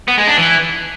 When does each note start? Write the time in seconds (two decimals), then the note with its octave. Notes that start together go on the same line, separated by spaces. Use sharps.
0.08 B3
0.18 G#3
0.28 D4
0.37 E3